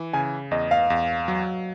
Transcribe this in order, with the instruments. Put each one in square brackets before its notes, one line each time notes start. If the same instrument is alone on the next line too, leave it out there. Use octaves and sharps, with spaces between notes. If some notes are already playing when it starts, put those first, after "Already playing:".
Already playing: [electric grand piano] E3
[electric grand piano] C#3 [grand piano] G#5
[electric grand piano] E2 [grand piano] D#5
[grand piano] F5
[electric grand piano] E2
F#3